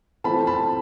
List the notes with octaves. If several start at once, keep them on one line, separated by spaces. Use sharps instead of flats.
E3 A3 C4 F4 A5 B5
A5 B5